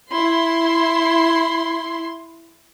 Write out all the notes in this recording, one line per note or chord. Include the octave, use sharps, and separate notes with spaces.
E4 C6